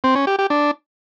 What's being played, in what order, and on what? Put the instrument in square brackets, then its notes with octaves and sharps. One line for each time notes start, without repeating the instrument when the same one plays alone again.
[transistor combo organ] C4
C#4
G4
G4
D4